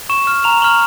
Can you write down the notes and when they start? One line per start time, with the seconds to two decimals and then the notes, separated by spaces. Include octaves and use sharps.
0.09 C#6 E7
0.27 F6
0.44 A#5 F7
0.62 C#6 F6 F#7